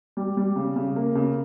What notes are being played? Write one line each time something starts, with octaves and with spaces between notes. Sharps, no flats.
G3
G3
C#3
C#3
A#3
C#3